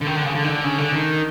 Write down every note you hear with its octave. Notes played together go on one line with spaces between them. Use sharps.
D3
D#3
D3
C#3
D3
D#3
D3
C#3
D3
D#3